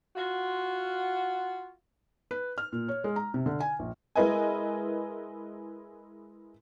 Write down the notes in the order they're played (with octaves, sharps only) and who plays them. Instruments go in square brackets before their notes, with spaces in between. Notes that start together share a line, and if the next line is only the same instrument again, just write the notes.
[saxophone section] F4 F#4
[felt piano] B4
F6
A#2
C#5
G#3
A#5
C3
D3
G#5
A#1
[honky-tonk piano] G#3 E4 A#4 B4 D#5 G#5